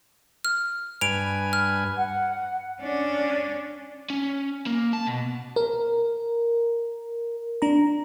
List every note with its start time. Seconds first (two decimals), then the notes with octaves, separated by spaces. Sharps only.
0.45 F6
1.01 G2 B4 G#5 D7 F7
1.53 F6
1.97 F#5
2.81 C#4 D4
4.10 C#4
4.66 A#3
4.93 A5
5.07 B2
5.56 A#4
7.62 D4 A#5